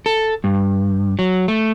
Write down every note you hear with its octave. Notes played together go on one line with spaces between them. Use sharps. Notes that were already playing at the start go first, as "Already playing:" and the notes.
A4
G2
F#3
A3